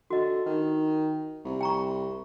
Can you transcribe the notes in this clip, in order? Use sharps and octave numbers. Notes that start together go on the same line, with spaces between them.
D3 F#4 D#5
D#3
C2
G5 A#5 C#6